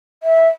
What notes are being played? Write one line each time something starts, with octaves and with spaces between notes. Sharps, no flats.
E5